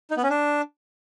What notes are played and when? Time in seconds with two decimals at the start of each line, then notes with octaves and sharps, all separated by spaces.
0.11 D#4
0.17 B3
0.24 C#4
0.30 D4